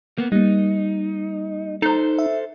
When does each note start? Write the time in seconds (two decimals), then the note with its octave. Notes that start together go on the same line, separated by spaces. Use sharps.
0.18 A#3 B3
0.32 G3 A#3 D#4
1.82 D#4 A4 C5
2.18 E5